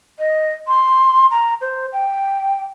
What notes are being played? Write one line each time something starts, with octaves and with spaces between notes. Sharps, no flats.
D#5
C6
A#5
C5
G5